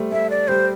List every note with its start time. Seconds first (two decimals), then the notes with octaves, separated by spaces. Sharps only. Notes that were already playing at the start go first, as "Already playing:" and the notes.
Already playing: G3 A3 A4 C5
0.12 A3 E5
0.30 D5
0.48 G3 C5